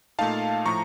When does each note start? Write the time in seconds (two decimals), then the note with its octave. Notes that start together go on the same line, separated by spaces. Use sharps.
0.19 A#2 A3 D#4 F5 A5
0.65 A2 F3 A#5 C#6